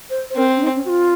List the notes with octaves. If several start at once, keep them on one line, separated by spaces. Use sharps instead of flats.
C5
C5
C4 A#4
C#4
D#4
C#4
F#4
F4